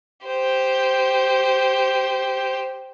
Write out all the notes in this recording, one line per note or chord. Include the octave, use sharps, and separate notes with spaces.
G4 C5